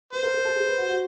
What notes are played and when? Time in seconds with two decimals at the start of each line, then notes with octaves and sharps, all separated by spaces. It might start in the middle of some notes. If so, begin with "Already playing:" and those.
0.13 B4 C5
0.23 A#4
0.34 A#4
0.45 A4
0.56 G#4
0.66 B4
0.78 F#4
0.89 F#4